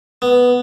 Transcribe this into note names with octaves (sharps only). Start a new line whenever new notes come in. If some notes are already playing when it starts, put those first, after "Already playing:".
B3